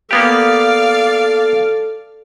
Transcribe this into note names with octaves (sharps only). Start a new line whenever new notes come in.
A#3 B3 G4 A4 D5 F5